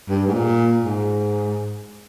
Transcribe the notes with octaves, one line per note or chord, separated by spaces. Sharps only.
G2
G#2
A#2
G#2